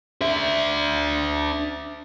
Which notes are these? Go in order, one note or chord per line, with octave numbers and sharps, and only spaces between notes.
D4 E5